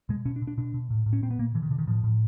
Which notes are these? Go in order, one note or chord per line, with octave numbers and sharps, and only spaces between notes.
B2 G#3
B2 C#4
D4
B2
D4
B2 D4
B2
A2
A2
C#4
A#2 C4
B3
A#2 A#3
B2 E3
D#3
B2 D3
D#3
A2 F3
A2